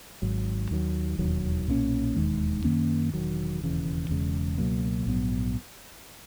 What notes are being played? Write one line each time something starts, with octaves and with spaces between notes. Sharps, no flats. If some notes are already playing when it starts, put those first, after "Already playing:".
G#1 G#2 F#3
D#2 D#3 F#3
E1 D#2 D#3 F#3
B1 A#2 A#3 C#4
E1 D#2 D#3 G#3
F#2 D#3 A#3 C#4
E1 D#2 D#3 F#3
E1 D#2 C#3 E3
E1 E2 C#3 G#3
C#2 B2 F#3 A#3
A#1 G#2 F#3 B3